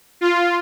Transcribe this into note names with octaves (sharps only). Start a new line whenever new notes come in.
F4